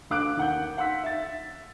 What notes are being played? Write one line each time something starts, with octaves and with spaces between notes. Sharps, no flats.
D2 F5 D6 F#6 D7
D#2 F#5 G6
F5 F#5 C6 E6 B6
E5 A6